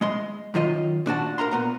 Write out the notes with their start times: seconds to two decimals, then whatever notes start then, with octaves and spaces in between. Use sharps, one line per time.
0.01 G#3 D#5 C6
0.54 F#2 D#3 F4 D#5
1.06 A#2 D4 F#4 A5
1.38 A#4 F5 A#5 C6
1.51 A#2 B3 A#5